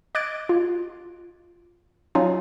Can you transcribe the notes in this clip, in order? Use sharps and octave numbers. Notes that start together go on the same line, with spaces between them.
D#5 D6 F#6 G#6 A6 D7
F4
F#3 C#4 D#4 F4